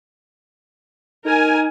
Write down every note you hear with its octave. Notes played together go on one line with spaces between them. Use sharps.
D#4 A#4 G#5